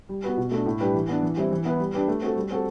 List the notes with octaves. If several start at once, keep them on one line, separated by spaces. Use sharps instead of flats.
G3
B3 F#4 B4
B2
A3 D4
A2
G3 D4 G4 B4
E3
B3 D4
E3
G3 C4 E4
E3
B3 E4 B4
G3
D4 G4 B4
A3
C4 F#4 A4
G3
C4 F#4 A4